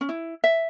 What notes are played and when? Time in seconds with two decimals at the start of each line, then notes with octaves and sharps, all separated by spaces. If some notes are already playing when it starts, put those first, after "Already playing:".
0.01 C#4
0.09 E4
0.44 E5